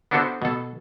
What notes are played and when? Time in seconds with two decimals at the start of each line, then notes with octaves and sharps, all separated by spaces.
0.11 B3 D4 E4 F#4 A4 C5
0.42 B2 A4